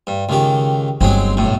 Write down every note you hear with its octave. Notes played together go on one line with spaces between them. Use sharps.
G2
C#2 D#3 G4
G1 F#3 G#3 C4
B1 A2